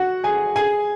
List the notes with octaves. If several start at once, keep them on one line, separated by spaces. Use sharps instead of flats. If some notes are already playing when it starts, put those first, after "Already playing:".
Already playing: F#4 F#5
G#4 G#5
G#4 G#5